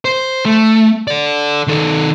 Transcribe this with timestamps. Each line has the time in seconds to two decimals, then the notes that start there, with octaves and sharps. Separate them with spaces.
0.05 C5
0.46 A3
1.08 A4 D5
1.67 D#3 A4